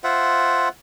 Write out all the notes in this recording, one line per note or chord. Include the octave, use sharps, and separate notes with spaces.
F4 C5 E5 F#5